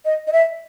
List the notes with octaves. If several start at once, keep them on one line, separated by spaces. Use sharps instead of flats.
D#5
D#5
E5